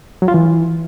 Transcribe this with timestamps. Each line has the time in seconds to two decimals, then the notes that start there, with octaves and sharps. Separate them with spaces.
0.22 F#3
0.28 F4
0.34 E3